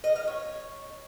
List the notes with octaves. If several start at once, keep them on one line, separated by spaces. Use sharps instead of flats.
D#5
F5
C#5